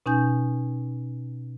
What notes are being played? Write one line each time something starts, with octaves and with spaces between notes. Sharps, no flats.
B2 C#4 D#4 G#5 G6